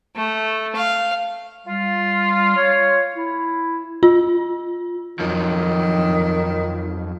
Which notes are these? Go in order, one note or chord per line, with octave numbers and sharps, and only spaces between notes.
A3
F5
G3 F4
C#5
E4
F4
F2 D#3 F3 F#3